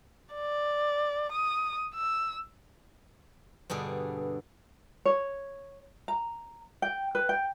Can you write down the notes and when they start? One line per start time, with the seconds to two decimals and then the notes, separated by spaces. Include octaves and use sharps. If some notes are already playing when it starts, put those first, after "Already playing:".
0.34 D5
1.32 D#6
1.94 E6
3.70 G2 B2 D3 G#4
5.06 C#5
6.08 A#5
6.82 G5
7.15 B4
7.29 G5